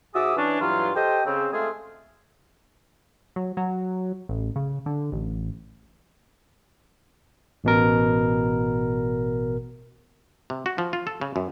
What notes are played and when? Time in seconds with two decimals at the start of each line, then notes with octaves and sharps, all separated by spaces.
0.14 G#2 F#4 G#4 E5 D6 D#6
0.36 E3 C#4 D4
0.60 G2 E3 F#3 F4
0.95 G4 A4 C5 D#5 G5
1.25 C#3 C4
1.52 G#3 A3 C4 F4 G#4
3.36 F#3
3.57 F#3
4.29 A1
4.56 C#3
4.86 D3
5.12 A1
7.64 A1 B2 A#4
10.50 C3
10.66 F#4
10.78 F3
10.93 F4
11.07 A4
11.21 C#3
11.36 F#2